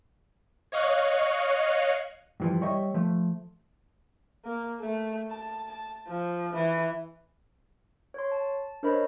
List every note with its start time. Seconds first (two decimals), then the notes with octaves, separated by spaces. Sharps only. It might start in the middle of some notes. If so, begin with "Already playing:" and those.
0.72 C#5 D#5 F5 C#6 F#6
2.40 G2 E3 F3
2.61 G3 C#5 D#5 E5
2.94 F3 A3
4.45 A#3
4.80 A3
5.31 A5
5.68 A5
6.08 F3
6.54 E3
8.14 C#5 C6
8.31 A5
8.83 D4 A#4 C5 C#5 D#5 B5